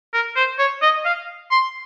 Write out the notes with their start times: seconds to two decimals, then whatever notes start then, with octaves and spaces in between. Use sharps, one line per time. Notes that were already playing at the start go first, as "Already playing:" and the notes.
0.14 A#4
0.36 C5
0.59 C#5
0.82 D#5
1.05 F5
1.51 C6